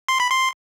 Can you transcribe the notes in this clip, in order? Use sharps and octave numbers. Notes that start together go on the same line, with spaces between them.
C6
B5
C6